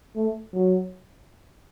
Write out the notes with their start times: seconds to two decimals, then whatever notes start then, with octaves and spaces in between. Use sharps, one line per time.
0.16 A3
0.54 F#3